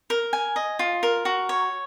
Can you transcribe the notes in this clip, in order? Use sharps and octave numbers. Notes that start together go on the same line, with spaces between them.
A#4
G#5
D#5
F4
A#4
F#4
C#5